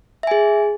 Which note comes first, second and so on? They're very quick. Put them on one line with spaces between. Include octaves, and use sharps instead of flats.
E5 G#5 G#4